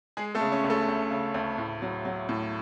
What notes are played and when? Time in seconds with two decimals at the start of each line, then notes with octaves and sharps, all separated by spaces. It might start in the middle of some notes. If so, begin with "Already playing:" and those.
0.17 G#3 G#4
0.35 A3 A4
0.41 C#3
0.52 C#4 C#5
0.64 D2
0.70 A3 A4
0.88 D2
1.11 C#3
1.34 D2
1.58 A2
1.82 F#3
2.05 F#3
2.29 A2